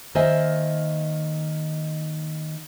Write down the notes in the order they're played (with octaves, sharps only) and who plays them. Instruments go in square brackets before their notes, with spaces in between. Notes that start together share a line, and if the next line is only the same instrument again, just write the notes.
[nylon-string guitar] D#3 A#3 C5 D#5 E5 G#5